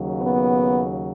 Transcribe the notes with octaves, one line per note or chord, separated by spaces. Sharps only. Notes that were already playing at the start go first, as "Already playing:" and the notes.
Already playing: D#2 C#3 F#3
B3